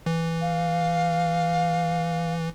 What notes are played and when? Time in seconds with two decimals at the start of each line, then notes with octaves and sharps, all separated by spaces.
0.06 E3
0.41 F5